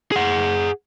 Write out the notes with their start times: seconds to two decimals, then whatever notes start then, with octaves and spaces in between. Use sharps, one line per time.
0.12 G#4 F#5